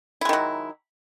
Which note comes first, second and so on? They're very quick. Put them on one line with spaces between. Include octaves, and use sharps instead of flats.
E4 G#3 D#3 F#3